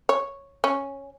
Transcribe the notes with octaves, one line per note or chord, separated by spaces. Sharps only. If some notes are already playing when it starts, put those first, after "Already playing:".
C#5
C#4